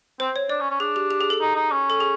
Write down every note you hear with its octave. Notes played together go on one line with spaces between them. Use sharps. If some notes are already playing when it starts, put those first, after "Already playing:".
C4 C5
C#5
D4 D5
C#4
C#4
D4 G#4
G4
G4
G#4
A4
D#4
D#4
C#4
A4
G#4